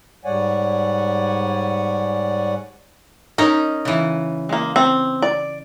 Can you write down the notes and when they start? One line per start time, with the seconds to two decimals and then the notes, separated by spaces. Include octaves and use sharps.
0.25 G#2 G3 C#5 D5 F#5 G#5
3.38 C#4 D#4 A#4 A#5
3.85 C#3 E3
4.49 G#3 A#3
4.76 C4
5.22 D5